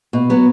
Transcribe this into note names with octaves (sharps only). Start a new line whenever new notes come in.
B2
F#3 B3